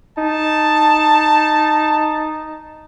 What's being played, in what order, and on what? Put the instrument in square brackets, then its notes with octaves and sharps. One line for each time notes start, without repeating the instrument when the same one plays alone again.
[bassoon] D#4 [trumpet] A5